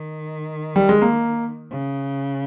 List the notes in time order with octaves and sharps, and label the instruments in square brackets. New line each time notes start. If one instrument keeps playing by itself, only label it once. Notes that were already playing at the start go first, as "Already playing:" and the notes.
Already playing: [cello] D#3
[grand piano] G3
G#3
A#3
[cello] C#3